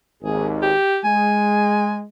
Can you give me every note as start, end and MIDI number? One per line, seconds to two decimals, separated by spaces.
0.23 0.72 32
0.23 0.72 39
0.23 0.47 68
0.63 0.99 67
1.04 2.02 56
1.04 1.99 80